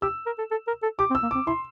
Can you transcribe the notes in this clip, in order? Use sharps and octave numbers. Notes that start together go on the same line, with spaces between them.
G4 E6
A#4
A4
A4
A#4
A4
G4 D6
C4
E6
A#3
C4 D6
E4 C6